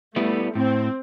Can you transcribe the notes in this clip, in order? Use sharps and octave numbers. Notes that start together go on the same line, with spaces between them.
G3 A3 B3 E4
A2 C4